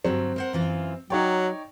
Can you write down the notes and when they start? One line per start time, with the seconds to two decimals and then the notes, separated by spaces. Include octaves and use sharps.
0.05 G2 D3 F#3 C4
0.36 A#4 C5 F#5
0.53 F#2 E3 F4
1.10 F#3 D#4 C#5 D5 G5